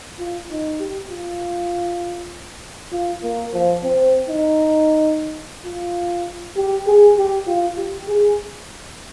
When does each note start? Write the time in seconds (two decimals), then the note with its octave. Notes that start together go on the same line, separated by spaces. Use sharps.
0.19 F4
0.50 D#4
0.80 G4
1.10 F4
2.92 F4
3.23 A#3
3.53 F3
3.83 C4
4.29 D#4
5.66 F4
6.56 G4
6.87 G#4
7.18 G4
7.47 F4
7.78 G4
8.08 G#4